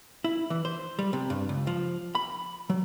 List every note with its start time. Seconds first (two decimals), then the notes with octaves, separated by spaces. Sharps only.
0.24 E4
0.50 E3
0.65 C5
0.99 G3
1.13 C3
1.30 G2
1.49 C#2
1.67 F3
2.15 B5
2.70 F#3